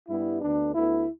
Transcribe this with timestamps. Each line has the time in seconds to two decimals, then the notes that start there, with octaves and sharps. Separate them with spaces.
0.09 G2 G3 B3 E4
0.42 D2 D3 B3 D4
0.75 D2 D3 B3 E4